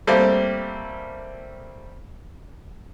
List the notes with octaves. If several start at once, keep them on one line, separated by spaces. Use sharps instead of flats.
G3 A3 A#3 C4